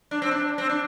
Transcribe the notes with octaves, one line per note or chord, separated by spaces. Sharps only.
D4
C4
D4
C4
D4